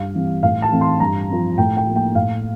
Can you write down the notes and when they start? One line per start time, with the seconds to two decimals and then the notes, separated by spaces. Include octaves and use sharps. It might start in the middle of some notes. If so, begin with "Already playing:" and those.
Already playing: G2 F5
0.15 E3 G3 C4
0.43 A2 F5
0.62 A5
0.72 E3 A3 C4
0.81 C6
1.00 G2 A#5
1.29 F3 C4
1.58 A2 G5
1.77 G5
1.86 F3 A#3
1.96 G5
2.15 A2 F5